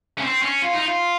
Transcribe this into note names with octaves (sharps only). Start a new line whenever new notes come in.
C#4
C4
C#4
F4
D#4
F4